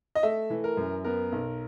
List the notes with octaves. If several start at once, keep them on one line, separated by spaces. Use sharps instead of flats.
D#5
A3 E5
E3
A#4
F#2
B3 A#4
B1